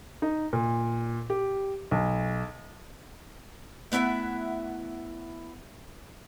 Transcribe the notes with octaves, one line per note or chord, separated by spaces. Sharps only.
D#4
A#2
G4
B1
A3 B3 E4 E5 F#5